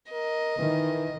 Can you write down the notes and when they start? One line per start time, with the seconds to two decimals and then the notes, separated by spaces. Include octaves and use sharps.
0.12 A#4 D#5
0.59 D#3 E3